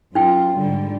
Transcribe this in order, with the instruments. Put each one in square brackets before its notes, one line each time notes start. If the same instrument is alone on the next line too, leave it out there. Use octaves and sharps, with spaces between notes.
[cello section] F#2 F4 [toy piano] D#4 G5
[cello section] G#2 D3 G3